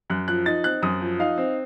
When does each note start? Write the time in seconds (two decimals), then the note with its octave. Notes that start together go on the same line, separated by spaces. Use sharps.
0.10 F#2 F#6
0.28 F3 F#6
0.46 D#4 A6
0.64 C4 F#6
0.82 F#2 D#6
1.01 F3
1.19 D#4 F5
1.38 C4